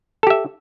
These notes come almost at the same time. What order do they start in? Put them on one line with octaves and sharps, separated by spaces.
A4 G4 E5